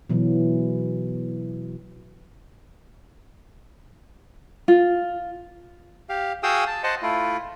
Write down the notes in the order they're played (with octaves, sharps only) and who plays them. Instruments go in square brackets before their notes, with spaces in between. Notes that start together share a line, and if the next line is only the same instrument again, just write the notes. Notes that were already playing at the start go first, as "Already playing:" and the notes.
[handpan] B2 E3 F#3
[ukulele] F4
[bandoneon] G4 F5
F#4 G#4 F5 G5 D#6 E6
A5
C5 D#5 F#5 A5
A3 E4 F4